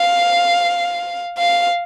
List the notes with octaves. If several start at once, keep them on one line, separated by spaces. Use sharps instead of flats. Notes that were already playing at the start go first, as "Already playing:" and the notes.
Already playing: F5
F5